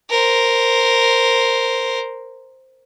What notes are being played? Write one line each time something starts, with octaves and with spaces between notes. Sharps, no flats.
A#4 C5